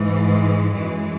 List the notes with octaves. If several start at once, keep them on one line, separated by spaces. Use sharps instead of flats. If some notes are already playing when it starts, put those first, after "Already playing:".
Already playing: G#2 E3
G#3
F#2 E3 G#3